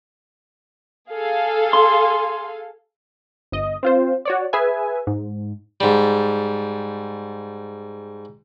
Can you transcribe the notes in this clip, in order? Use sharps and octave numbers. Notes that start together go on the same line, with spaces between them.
G#4 A4 F5
C6
G1 D#5
C4 F4 C5
F#4 C#5 D5
G#4 B4 E5 G#5
G#2
G#2 G3